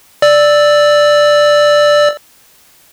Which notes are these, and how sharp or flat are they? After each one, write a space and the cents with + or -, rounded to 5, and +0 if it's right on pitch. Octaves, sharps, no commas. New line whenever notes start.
D5 +5 E6 -5